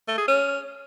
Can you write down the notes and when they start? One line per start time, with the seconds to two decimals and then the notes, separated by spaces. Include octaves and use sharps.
0.08 A3
0.18 G#4
0.28 C#4